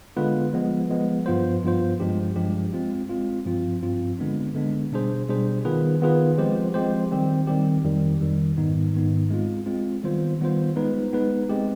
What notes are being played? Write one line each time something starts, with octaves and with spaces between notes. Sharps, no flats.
D3 G#3 B3 F4 B4
F3 G#3 B3
F3 G#3 B3
G2 F3 B3 F4 C5
G2 F3 B3 F4 C5
G2 F3 G#3 D4 G4
G2 F3 G#3 D4 G4
G#3 C4 F4
G#3 C4 F4
G2 F3 C4 F4
G2 F3 C4 F4
D3 G#3 B3 D4
D3 G#3 B3 D4
B2 G3 D4 G#4 C5
B2 G3 D4 G#4 C5
D#3 B3 F4 G#4 B4
D#3 B3 F4 G#4 B4
F3 G#3 C4 G4 C5
F3 G#3 C4 G4 C5
D#3 G3 C4 G4
D#3 G3 C4 G4
F2 D#3 G3
F2 D#3 G3
G#2 D#3 B3 D#4
G#2 D#3 B3 D#4
G#3 C4 F4
G#3 C4 F4
D#3 G3 B3 F4 C5
D#3 G3 B3 F4 C5
G#3 B3 D#4 B4
G#3 B3 D#4 B4
G#3 C4 G4